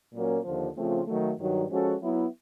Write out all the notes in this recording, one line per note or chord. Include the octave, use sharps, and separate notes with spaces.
A#2 F#3 A#3 C#4
D#2 D3 F3
C#3 F3 A3 C4 F4
D#3 F#3 A3
G2 D#3 F#3
F3 G#3 C#4 F#4 A4
F#3 B3 E4